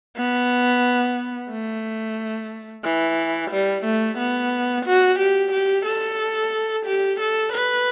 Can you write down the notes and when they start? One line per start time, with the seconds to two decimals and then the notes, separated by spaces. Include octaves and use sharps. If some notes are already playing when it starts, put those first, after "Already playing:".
0.16 B3
1.50 A3
2.84 E3
3.51 G3
3.85 A3
4.18 B3
4.86 F#4
5.19 G4
5.53 G4
5.85 A4
6.86 G4
7.20 A4
7.53 B4